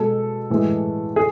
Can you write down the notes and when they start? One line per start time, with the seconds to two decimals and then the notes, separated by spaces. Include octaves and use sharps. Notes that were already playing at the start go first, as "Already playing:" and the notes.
Already playing: B2 G#3 A4
0.50 A2 E3 G#3
1.16 G#4